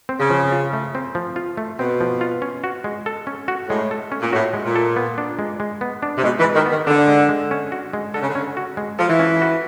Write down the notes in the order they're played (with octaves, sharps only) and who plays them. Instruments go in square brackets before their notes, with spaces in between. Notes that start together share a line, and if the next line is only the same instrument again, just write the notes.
[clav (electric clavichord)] C4
[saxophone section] C#3
[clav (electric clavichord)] F3
F4
A3
C4
F3
F4
A3
[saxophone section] B2 [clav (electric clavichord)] C4
[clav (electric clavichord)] F3
F4
C#4
F#4
G#3
A4
C#4
F#4
[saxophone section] A2 [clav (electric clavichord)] G#3
[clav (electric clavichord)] A4
C#4
[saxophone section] A#2
[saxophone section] A2 [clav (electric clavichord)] F#4
[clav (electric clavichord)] G#3
[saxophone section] A#2
[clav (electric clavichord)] A4
B3
D4
G#3
G#3
B3
D4
[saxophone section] C3
[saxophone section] B2 [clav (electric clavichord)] G#3
[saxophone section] E3
[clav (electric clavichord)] G#3
[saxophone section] D#3
[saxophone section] D#3 [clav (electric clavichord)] B3
[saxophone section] D3 [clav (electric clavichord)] D4
[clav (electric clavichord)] G#3
G#3
C#4
F#4
G#3
[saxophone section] D3 [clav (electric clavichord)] A4
[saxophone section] C#3
D3
[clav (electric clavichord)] C#4
F#4
G#3
[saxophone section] F3 [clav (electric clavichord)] A4
[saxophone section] E3
[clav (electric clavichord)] C#4
F#4